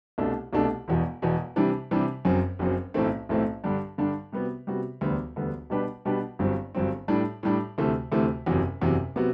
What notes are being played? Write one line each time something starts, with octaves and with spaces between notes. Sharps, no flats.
C2 B2 A3 D4 A4
C2 B2 A3 D4 A4
E1 E2 B2
E1 E2 B2
C3 E3 G3 D4
C3 E3 G3 D4
F#1 F#2 F#3 C4
F#1 F#2 F#3 C4
B1 A2 E3 A3 C4
B1 A2 E3 A3 C4
G2 D3 G3 D4
G2 D3 G3 D4
C3 G3 B3 F#4
C3 G3 B3 F#4
E1 D2 D3 G3 B3
E1 D2 D3 G3 B3
B2 G3 D4 G4 B4
B2 G3 D4 G4 B4
G1 G2 F#3 C4
G1 G2 F#3 C4
A2 G3 D4
A2 G3 D4
D2 C3 E3 A3
D2 C3 E3 A3
F#1 E2 C3 F#3
F#1 E2 C3 F#3
C3 F#3 B3 F#4